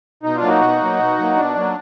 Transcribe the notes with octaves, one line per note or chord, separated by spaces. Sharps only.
B2 D#4
D4 F4
F#3 A#3
D#4 F#4
B2
F#3 A#3
B2
F#3 A#3
B2 D4
F#3 A#3